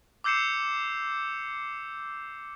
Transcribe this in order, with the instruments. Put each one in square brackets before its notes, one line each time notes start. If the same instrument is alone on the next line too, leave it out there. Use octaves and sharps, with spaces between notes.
[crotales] D6 E6 G6 C7 C#7 E7